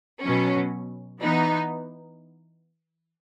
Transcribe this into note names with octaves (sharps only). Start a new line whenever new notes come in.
B2 F#3 C#4
E3 B3 D#4